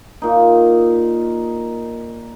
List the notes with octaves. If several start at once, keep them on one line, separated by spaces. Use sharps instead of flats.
A#2 D#4